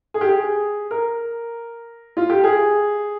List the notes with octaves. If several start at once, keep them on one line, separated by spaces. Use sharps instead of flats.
G#4
G4
G#4
A#4
F4
G4
G#4